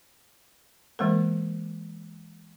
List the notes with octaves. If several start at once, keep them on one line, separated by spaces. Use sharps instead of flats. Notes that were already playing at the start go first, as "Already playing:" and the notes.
E3 G#3 A#3 A#4